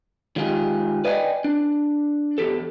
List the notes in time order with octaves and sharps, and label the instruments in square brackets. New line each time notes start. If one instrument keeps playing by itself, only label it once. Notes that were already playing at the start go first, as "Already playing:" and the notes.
[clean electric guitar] D#3 G#3 F4 G4 G#4
B4 D5 D#5 F5 G5 G#5
D4
E2 G4 A4